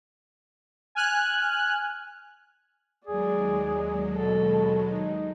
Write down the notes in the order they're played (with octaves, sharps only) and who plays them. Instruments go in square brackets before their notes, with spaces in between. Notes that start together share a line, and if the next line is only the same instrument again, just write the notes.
[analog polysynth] G#5 F6 F#6
[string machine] D#2 F#3 G#3 [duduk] G#4 [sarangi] D5
[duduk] B2 [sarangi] A4
[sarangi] D#4